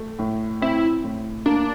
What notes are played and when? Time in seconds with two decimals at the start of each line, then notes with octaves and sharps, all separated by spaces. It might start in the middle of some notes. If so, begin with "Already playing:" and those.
Already playing: A3
0.19 A2
0.62 C4 E4
1.04 A2
1.46 A#3 D4